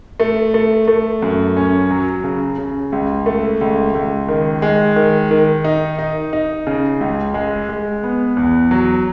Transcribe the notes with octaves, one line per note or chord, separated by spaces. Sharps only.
A3
A3
A3
F#2
C#4
F#3
C#3
C#3
C#2
A3
C#2
C#2
D#3
G#3
D#3
D#3
D#4
D#4
D#4
C#3
C#2
G#3
G#3
B3
E2
F#3